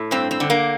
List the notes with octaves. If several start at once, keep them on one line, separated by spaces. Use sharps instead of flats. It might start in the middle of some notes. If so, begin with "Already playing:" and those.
Already playing: A2
G2 C4
C4
D3
A#3